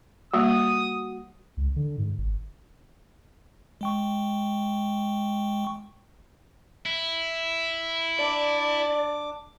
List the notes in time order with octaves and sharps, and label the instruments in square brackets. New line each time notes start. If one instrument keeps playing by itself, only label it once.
[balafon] G3 A#3 [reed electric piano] F#4 [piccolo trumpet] D#6
[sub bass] C#2
D3
G#2
G1
[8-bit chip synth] G#3 G5 C#6
[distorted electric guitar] E4
[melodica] D4 D6 [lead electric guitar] D5